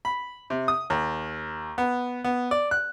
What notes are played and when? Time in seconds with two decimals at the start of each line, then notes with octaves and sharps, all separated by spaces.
0.05 B5
0.50 C3
0.68 D#6
0.90 D#2
1.78 B3
2.24 B3
2.51 D5
2.71 F#6